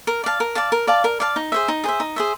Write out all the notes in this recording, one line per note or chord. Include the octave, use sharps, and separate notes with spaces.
A#4
D5 F5 A5
A#4
D5 F5 A5
A#4
D5 F5 A5
A#4
D5 F5 A5
D#4
G#4 C5 E5
D#4
G#4 C5 E5
D#4
G#4 C5 E5